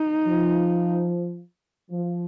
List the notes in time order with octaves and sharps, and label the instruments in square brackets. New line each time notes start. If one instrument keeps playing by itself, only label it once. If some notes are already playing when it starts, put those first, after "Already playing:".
Already playing: [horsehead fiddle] D#4
[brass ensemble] F3
F3